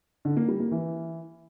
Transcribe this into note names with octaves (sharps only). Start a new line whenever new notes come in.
D3
A#3
G3
A#3
E3